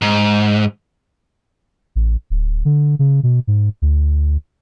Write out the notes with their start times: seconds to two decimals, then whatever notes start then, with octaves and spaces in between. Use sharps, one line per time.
0.02 G#2
1.96 A1
2.30 D1
2.65 D3
2.99 C#3
3.23 B2
3.47 G#2
3.82 D2